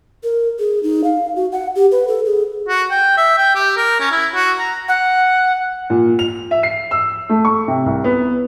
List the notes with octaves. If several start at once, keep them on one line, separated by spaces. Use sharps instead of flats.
A#4
G#4
D#4
F5
F#4
F#5
G4
B4
A4
G#4
F#4
G5
E5
G5
G4
A#4
C#4
E4
F#4
A#5
F#5
A#2
F7
E5
C7
E6
A3
C#6
C3
C2
B3